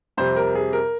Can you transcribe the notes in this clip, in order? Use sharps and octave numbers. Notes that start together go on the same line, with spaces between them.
F2 C3 G3 C4 C5
A#4
G#4
A#4